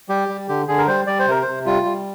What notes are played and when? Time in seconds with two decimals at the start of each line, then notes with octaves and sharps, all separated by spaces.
0.09 G3 G4
0.29 G3
0.48 D3 G4
0.68 D3 G#4
0.78 A#4
0.87 G3 C5
1.07 G3 D5
1.19 C5
1.28 C3 A#4
1.42 C3 C5
1.66 G3 F4
1.85 G3